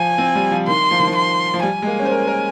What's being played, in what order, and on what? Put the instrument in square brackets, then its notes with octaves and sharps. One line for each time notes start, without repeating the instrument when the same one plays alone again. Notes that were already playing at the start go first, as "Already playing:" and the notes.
Already playing: [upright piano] F3 [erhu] G#5
[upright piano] C4
G3
F3
[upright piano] D#3 [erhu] C6
[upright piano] F3
D#3
F3
[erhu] C6
[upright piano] F3
[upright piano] G3 [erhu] G#5
[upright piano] G#3
A#3
C#4
C5
A#4
A#4